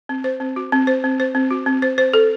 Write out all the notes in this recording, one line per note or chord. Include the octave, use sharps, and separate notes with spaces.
C4
C5
C4
F#4
C4
C5
C4
C5
C4
F#4
C4
C5
C5
A4